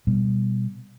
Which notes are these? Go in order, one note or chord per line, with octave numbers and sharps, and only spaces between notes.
B2 G3 B3